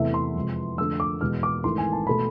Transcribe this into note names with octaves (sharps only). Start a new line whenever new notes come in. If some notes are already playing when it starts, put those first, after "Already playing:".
Already playing: E2 C3 E3 A3 E5
C6
F2 C3 G#3
F2 D3 A3 E6
D6
E2 B2 G#3 F6
D6
G#1 G#2 E3 A3 C6
G#5
A5
B2 A3 B5